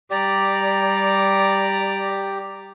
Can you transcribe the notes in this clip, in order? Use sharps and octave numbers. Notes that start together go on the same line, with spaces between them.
G3 G4 D5 A#5 D6